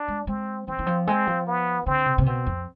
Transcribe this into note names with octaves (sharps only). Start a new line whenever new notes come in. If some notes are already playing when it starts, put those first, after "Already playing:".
Already playing: D4
G#3
G#3 C4
E3 C4
E3
F3
G#3 C4
F3
B3
D3 C4
C3
C3
B2 C4
F2